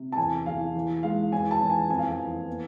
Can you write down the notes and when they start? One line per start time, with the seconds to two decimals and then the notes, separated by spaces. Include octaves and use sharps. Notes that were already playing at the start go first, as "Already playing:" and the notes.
Already playing: C3
0.12 A5
0.17 E2 G#5
0.46 E2 F5
0.75 E3
1.03 G#3 F5
1.32 E2 G#5
1.51 A5
1.61 E2
1.70 G#5
1.89 F2 G#5
1.99 F5
2.09 G#5
2.18 E3
2.48 B3